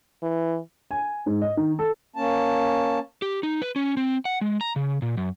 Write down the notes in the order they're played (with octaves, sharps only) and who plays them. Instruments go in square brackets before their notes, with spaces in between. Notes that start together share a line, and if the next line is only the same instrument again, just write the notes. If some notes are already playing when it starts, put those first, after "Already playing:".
[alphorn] E3
[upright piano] G#5
G#2
D#5
D#3
A4
[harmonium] A#3 C#4 A5
[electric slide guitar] G4
D#4
B4
C#4
C4
F#5
G#3
A#5
C#3
A#2
F#2